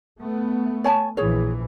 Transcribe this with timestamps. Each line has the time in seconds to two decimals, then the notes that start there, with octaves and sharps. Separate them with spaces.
0.20 A3 B3
0.84 C#5 G#5 A5
1.17 A#1 E3 G#4 C#5